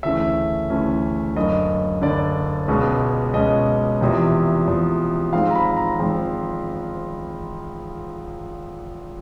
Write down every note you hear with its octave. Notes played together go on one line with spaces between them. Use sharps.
D2 C#3 E3 A3 C#4 E5
D2 C#3 E3 A3 C#4
F#1 F#2 D3 D#5
F#1 F#2 D3 D5
C#2 B2 G#3 C#4
C#2 B2 G#3 C#4 D#5
E2 C3 F3
E2 C3 F3
G#1 G#2 F3 G#3 C4 F5
A#5
B5
A#5
G#1 G#2 F3 G#3 C4